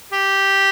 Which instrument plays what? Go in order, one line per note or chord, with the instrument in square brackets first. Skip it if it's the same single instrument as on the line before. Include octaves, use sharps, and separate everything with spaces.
[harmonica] G4